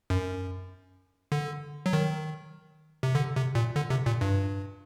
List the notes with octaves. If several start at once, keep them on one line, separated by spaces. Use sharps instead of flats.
F#2
D3
F#3
D#3
C3
D3
C3
A#2
D3
C3
A#2
G2